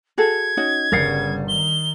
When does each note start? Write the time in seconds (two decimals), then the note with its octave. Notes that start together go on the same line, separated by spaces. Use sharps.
0.18 F#4 G#4 A4 G#6
0.57 C#4 D#4 F#4
0.92 G1 C#3 G3 A#4 F#5 A6 C7
1.48 D#3 G7